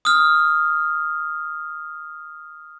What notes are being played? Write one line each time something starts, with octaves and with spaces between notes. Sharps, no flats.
D#6 F6